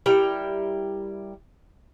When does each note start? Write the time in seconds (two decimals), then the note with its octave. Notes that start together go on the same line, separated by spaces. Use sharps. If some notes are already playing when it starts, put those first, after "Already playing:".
0.06 G3 E4 A#4 G5